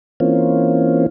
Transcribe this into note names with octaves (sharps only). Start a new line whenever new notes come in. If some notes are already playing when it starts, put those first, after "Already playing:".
E3 A#3 C4 C#4 F4